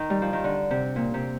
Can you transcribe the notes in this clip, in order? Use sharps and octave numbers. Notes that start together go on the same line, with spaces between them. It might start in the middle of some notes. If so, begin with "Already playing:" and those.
Already playing: D#3
G3
F3
D#3
D3
C3
A#2
C3